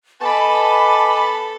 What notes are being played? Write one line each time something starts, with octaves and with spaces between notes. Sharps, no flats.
B3 A4 D#5 G#5 A5 B5 D6